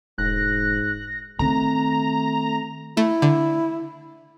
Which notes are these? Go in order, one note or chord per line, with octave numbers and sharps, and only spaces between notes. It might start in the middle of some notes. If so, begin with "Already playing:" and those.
E1 G#2 F#6 A#6
D#3 A3 C4 A#5
A3 E4
D3